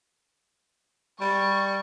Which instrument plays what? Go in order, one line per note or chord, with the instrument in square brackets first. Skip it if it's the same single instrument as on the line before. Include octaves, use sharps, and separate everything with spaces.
[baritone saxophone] G3 [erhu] C#6